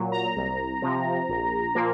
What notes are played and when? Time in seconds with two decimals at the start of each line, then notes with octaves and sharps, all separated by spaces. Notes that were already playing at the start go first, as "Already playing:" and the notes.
Already playing: A#2 F#3
0.12 A#5
0.36 C2
0.82 C3 F3
1.29 A#1
1.75 A#2 F3 A#3